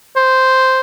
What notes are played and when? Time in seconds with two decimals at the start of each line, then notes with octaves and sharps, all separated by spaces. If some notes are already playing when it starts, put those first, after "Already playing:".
0.16 C5